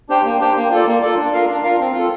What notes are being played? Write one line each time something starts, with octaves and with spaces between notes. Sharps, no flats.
D4 G4 C5 G5
A#3
D4 G4 C5 G5
A#3
F4 A4 D5
A#3
F4 A4 D5
D4
F4 A#4 F5
D4
F4 A#4 F5
C4
F4 A4